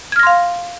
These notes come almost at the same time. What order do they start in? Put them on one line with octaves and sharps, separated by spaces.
G#6 F6 A#6 C6 F5